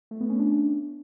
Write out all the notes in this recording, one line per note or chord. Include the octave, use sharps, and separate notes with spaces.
A3
B3
C#4
D4